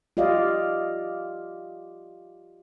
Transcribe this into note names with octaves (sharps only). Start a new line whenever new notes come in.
F4 G4 D5 D#5 F5